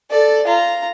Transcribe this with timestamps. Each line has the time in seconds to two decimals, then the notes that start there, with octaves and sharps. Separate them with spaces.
0.11 A4 D5
0.46 F4 A#5